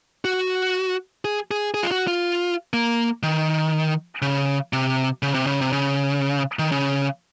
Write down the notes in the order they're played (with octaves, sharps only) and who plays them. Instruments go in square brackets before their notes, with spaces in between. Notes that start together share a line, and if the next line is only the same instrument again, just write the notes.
[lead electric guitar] F#4
G#4
G#4
G#4
F4
F#4
F4
A#3
D#3
C#3
C3
C#3
C3
C#3
C3
C#3
D#3
C#3